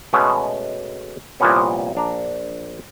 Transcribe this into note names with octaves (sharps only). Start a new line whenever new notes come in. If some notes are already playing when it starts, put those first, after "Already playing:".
B2 G#3 A3 B3 C#4
C2 A#2 F3 A#3 B3 C#4
A#1 D4 A#5